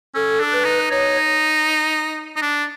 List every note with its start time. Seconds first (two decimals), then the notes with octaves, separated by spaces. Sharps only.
0.15 C#4 A4
0.40 D4
0.52 B4
0.65 D#4
0.91 D#4 C#5
2.36 D#4
2.42 D4